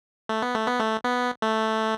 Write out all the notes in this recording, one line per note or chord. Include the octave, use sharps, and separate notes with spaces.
A3
B3
A3
B3
A3
B3
A3